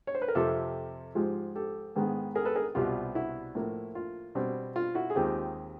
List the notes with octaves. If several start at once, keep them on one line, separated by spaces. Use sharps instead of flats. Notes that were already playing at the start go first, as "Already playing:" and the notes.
C#5
C5
B4
A#4
F2 C3 F3 G4 A4
G#2 F3 G#3 F4 G4
G4 A4
G#2 D#3 G#3 B3
G#4 A#4
A4 B4
G#4 A#4
C2 B2 G3 B3 F4 G4
E4 F#4
A2 F3 A#3
F4
B2 G3 C4
F4
E4 F#4
G#4
D#2 D#3 G#3 C4 F4 G4